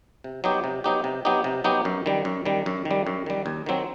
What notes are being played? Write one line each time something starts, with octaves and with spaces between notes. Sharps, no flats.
C3
F#3 B3 D#4 G4
C3
F#3 B3 D#4 G4
C3
F#3 B3 D#4 G4
C3
F#3 B3 D#4 G4
F#2
D#3 G3
F#2
D#3 G3
F#2
D#3
G3
F#2
D#3 G3
D#2
D#3 F#3 C4